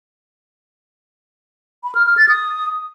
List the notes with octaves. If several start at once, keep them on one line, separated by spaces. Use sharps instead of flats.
B5
F6
F6
A6
D#6